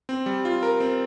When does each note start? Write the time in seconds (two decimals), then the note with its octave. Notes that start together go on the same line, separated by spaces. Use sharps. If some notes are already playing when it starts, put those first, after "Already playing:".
0.09 C4
0.26 G3
0.45 F4
0.63 A#4
0.80 C4